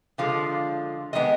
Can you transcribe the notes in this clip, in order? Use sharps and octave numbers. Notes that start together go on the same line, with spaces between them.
D3 F3 G#3 F5
D#3 G#3 B3 D#5